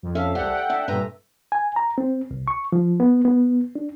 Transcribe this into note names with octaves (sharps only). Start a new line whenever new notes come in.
F2
C#4 A4 E5 F5
C2 G4 C5 D5 F#5
F#5 G5
D4 E5
G2 A#2 C4 B4 A#5
G#5
A#5
C4
C2
C#6
F3
B3
B3
D4